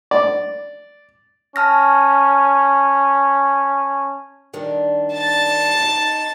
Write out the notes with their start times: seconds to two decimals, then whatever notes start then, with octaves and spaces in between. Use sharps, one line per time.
0.11 D5
1.56 C#4 A5 F6 A#6
4.54 D#3 G3 D4
5.15 A5 A6
5.80 D#4